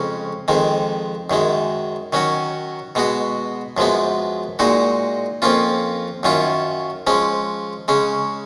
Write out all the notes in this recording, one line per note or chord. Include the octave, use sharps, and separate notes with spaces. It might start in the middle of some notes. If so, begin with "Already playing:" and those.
Already playing: F2 C#3 G#3 C#4
F2 D#3 G#3
F#2 D#3 G#3
D#3 F#3 C#4 F#4
B2 G#3 B3 F#4
F#2 F3 G#3 B3
A#2 G#3 D#4 F#4
F2 F3 A#3 C#4 F4
F#2 D#3 F#3 C#4 F4
F3 G#3 C#4
C#3 G#3 C#4